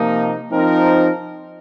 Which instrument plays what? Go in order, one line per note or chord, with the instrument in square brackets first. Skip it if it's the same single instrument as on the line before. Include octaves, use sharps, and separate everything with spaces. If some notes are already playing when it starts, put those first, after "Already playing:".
Already playing: [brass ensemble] C3 F3 A#3 D#4
F3 C4 D#4 A#4